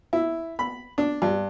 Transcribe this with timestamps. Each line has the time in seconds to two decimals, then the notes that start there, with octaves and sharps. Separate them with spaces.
0.13 E4
0.59 B5
0.98 D4
1.22 G2